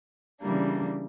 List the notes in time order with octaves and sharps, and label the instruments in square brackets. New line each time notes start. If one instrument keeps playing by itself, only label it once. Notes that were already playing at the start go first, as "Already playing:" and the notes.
[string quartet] C#3 E3 G3 A#3 D4